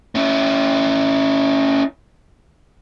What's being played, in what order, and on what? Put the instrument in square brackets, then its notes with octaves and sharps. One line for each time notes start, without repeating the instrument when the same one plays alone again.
[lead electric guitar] C#4 E4